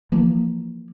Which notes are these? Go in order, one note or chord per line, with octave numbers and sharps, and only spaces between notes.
E3 F3 A#3